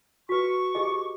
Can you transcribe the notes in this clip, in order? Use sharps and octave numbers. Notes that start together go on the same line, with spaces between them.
F#4 B4 C#6
G4 G#4 D#5